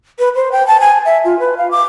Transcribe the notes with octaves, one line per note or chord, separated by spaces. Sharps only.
B4
C5
G5
A5
G#5
E5
F4
B4
F5
D6